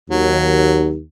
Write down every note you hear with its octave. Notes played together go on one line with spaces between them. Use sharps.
D#2 F#3